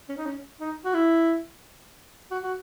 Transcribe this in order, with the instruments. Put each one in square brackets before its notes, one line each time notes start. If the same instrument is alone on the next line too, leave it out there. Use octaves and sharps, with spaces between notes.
[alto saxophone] C#4
D#4
C#4
D#4
F#4
E4
F#4
F#4